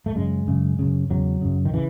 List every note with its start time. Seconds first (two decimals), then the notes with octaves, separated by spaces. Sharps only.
0.06 A3
0.16 F#2 C#3 G#3
0.47 F#2 C#3
0.79 F#2 C#3
1.10 E2 C#3 F#3
1.41 F#2 C#3
1.65 D#3
1.74 C#3 E3